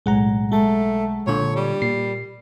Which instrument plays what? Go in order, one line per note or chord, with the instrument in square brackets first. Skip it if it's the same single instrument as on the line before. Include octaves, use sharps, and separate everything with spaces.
[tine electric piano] B1 F#5 A#5 [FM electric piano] A2 G#3
[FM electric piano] G#3 A5 [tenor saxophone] A3
[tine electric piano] A#2 D3 [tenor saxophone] C#5
[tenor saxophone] G3
[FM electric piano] A#2 [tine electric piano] C7